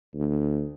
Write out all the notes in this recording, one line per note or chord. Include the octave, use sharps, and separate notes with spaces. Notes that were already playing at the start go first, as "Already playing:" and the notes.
D2